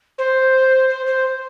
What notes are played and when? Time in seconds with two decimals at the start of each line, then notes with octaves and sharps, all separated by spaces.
0.18 C5
0.89 C5
1.06 C5